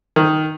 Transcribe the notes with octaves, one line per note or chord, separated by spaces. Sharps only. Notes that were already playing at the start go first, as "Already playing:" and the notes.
D#3